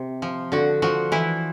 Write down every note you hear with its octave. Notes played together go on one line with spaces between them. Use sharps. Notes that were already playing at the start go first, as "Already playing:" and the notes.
Already playing: C3
F3
D3 F#4
F3 F#4
E3 E4